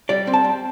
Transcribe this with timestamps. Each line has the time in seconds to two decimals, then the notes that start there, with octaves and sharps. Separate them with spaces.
0.09 G3 D5
0.27 C4
0.33 A5
0.45 C4